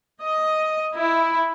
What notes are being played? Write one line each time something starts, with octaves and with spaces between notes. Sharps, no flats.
D#5
E4